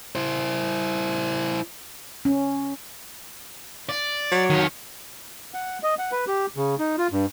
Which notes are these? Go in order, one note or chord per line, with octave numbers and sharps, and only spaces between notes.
E4 C5
C#4
D5
F#3
D#3 C#5
F#5
D#5
F#5
B4
G4
C#3
D#4
F4
G2